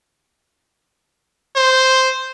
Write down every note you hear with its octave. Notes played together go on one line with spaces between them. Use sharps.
C5